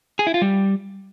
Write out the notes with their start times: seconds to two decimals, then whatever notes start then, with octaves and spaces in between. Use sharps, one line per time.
0.19 G#4
0.27 E4
0.34 F4
0.42 G3